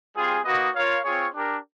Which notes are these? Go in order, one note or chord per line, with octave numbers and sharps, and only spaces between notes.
G3 C4 F4 G#4
A#3 D#4 F#4 B4 D#5
F4 A#4 C#5 F5
C4 F4 G#4 C#5
D4 G4 A#4